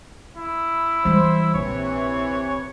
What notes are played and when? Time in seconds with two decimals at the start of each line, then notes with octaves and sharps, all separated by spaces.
0.37 E4
1.05 E3 G3 C5
1.54 A#1 C3 E3 C#5